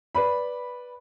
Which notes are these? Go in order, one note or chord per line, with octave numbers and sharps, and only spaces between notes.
B4 D5 B5